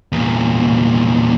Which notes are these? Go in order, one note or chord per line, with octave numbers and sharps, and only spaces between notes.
E2 A#2